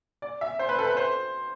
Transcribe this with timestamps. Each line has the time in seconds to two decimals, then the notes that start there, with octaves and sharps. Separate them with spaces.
0.22 D5
0.41 E5
0.59 C5
0.69 B4
0.78 A4
0.87 B4
0.97 C5